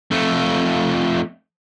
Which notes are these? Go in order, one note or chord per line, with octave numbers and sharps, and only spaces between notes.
F2 A3